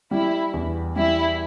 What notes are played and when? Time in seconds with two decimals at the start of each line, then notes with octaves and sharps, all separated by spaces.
0.11 G3 E4
0.53 E2
0.96 G3 E4